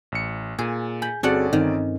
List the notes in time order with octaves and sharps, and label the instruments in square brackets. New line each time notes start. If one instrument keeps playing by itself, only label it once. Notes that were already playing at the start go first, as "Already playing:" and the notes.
[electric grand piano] A1 C#7
[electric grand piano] A#2 [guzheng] G#4
[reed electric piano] G#5 G6 [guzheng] B5
[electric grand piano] G1 D5 [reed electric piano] C4 F#4 G#4 [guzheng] C#4 A4 F#5
[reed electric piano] G2 C4 D#4 [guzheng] D#3